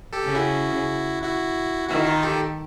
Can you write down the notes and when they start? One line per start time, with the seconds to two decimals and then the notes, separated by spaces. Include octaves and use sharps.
0.13 G4 A4
0.23 C#3
0.35 E4 F#4
1.23 E4 F#4
1.89 D#3 E4 F#4
2.07 D#4 F4
2.23 G4 A4